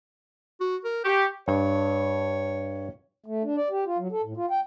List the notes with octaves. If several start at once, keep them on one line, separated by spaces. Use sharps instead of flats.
F#4
A#4
G4 C#6
G2 C#5
A3
D4
D5
G4
F4
F#3
A4
A2
F4
G5